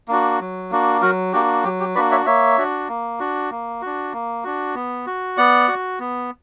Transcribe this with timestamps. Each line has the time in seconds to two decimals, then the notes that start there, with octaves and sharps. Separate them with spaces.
0.08 A#3 D4 F#4
0.40 F#3
0.71 A#3 D4 F#4
1.02 F#3 F#4 A#4
1.33 A#3 D4 F#4 G4
1.64 F#3 G4
1.80 G4
1.95 A#3 D4 F#4 B4 D5
2.11 C#5 E5
2.26 A#3 C#5 E5
2.58 D4 F#4
2.88 A#3
3.19 D4 F#4
3.51 A#3
3.82 D4 F#4
4.13 A#3
4.44 D4 F#4
4.75 B3
5.07 F#4
5.37 B3 D5 F#5
5.68 F#4
6.00 B3